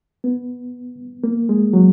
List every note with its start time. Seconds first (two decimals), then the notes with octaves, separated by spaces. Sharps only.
0.24 B3
1.24 A#3
1.49 G#3
1.73 F#3